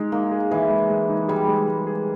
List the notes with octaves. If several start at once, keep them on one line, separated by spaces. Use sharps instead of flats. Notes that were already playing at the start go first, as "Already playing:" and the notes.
Already playing: G#3 D#4
A#3 D#4
G#4
E3 G#4
G#3
G#3
D#4
G3 G#4
G#3
G#3
G#4